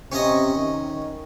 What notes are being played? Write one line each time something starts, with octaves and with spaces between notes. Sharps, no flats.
C3 C#4 D#5
D#3